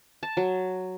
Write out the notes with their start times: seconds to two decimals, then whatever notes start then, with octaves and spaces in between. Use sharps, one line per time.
0.23 A5
0.37 F#3